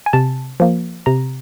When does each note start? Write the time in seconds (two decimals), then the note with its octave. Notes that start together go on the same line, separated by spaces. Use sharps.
0.06 G#5
0.13 C3 A5
0.60 F3 A#3
1.06 C3 A#5